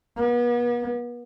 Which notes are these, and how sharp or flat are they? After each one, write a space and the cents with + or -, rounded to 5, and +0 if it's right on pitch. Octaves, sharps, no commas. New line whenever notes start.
B3 -40